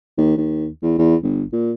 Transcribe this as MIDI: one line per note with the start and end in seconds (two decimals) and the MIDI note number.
0.18 0.34 39
0.37 0.68 39
0.83 0.99 40
0.99 1.16 40
1.23 1.44 31
1.53 1.73 46